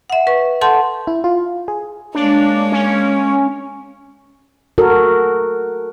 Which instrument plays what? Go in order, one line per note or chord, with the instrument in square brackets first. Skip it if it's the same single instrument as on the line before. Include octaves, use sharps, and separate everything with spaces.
[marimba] E5 F#5
B4 C#6
A4 F#5 A5 C6 G6
[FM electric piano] E4
F4
G#4
[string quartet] G#3 A#3 C#5 [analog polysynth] D4
[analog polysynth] C#4
[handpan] F#4 A4 A#4